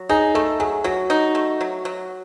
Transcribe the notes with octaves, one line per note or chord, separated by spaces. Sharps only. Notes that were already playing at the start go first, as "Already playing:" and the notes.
Already playing: F#3
D#4 G#4
A3 A4
F#3 G#4
F#3 F#4
D#4
A3
F#3
F#3